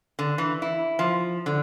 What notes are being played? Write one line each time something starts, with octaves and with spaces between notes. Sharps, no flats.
D3
E3
E4
F3
D3